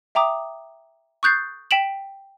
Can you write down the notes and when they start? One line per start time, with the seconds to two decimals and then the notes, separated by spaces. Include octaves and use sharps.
0.15 E5 G5 A#5 D6 D#6
1.23 C#6 D#6 F#6 G6 A6 C7
1.71 G5 B6 D7 E7 F#7